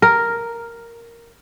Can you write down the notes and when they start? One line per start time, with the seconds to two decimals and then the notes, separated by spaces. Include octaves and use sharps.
0.02 A#4